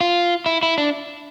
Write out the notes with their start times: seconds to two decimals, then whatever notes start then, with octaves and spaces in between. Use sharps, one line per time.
0.01 F4
0.46 E4
0.63 E4
0.78 D4